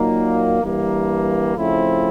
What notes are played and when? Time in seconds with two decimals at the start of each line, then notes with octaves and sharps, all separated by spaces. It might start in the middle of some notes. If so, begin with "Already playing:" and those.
Already playing: A#2 F#3 A#3 D#4
0.61 G2 E3 G3 A#3
1.55 C#3 F3 A3 C4 E4